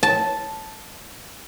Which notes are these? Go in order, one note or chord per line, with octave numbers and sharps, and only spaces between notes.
A5